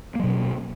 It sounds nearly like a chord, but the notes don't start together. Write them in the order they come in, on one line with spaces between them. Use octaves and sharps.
A#3 F#3 B2 C#4